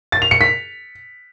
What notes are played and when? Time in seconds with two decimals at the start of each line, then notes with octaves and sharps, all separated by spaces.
0.12 A6
0.22 F7
0.31 C#7
0.41 B6